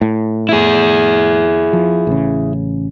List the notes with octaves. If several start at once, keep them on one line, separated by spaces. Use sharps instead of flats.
A2
E4 G#4
F3
A1 C#3